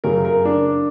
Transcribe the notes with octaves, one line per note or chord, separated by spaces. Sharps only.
F#2 C#3 F#3 A#4
A#4
D4